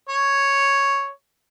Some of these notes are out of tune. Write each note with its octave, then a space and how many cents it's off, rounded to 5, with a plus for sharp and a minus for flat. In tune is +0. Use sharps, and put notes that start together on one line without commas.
C#5 +0